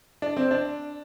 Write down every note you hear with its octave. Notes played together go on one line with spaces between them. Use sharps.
D4
C4
D4